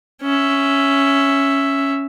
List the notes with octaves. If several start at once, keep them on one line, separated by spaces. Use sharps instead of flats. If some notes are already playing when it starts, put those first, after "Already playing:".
C#4 E5